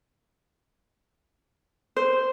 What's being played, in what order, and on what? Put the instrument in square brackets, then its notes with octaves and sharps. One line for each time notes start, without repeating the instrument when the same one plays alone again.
[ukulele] C5